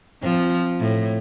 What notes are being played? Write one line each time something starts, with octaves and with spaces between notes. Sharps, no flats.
F3 C4
A2